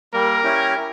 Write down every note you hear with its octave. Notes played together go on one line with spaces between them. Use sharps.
G3 A#3 A#4
C#4 E4 G4